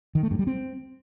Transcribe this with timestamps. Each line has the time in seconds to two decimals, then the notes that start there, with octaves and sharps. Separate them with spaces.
0.15 D#3
0.23 A3
0.31 G2
0.39 G3
0.47 C4